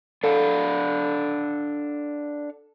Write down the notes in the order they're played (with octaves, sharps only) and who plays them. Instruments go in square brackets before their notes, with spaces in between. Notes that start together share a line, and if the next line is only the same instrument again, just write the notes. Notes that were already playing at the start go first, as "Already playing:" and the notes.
[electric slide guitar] D4 F5 F#5 [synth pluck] A4